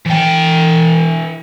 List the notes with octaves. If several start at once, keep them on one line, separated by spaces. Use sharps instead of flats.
E3 G5